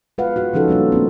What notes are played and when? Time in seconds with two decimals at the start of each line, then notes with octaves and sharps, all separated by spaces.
0.18 G#3 F4 B4 F5 F#5
0.36 F4 F#4
0.53 C#3 F3 C#4 D#4 F#4 A4
0.68 G3 A#3 D4 F4
0.92 A3 A#3 C4